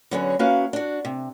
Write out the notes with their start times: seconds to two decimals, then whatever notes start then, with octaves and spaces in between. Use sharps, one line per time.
0.11 D3 F#3 B3 C#4 F#4 G#4
0.39 A#3 C#4 E4 F#4 B4 F5
0.73 D4 F#4
1.05 C3